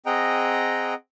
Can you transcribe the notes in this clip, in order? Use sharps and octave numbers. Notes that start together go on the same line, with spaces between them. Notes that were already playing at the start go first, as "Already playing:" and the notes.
C4 G#4 D#5 F#5 G5 A#5